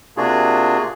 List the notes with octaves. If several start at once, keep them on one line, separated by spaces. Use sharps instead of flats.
C3 A#3 D4 F4 F#4 G#4